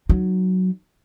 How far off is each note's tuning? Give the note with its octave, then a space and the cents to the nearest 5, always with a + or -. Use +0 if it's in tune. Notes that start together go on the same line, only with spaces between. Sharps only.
F#3 +5 D#4 +0